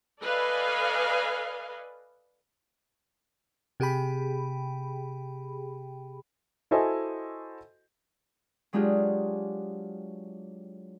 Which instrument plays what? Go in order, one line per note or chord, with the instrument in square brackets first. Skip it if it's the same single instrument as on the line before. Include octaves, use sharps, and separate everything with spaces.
[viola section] A4 B4 D5 D#5 F5 G#5
[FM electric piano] C3 G4 G#4 G5 B5
[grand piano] E4 F#4 A4 C5 D#5 G#5
[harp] F#3 G#3 D4 F4 G4 G#4